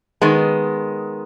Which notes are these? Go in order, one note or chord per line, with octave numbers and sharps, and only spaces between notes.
D#3 G#3 B3